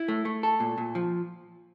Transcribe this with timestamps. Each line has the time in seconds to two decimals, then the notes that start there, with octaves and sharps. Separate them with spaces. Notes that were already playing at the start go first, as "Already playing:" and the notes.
Already playing: E4
0.08 A3
0.25 A3
0.43 A4
0.60 A#2
0.78 A#2
0.95 F3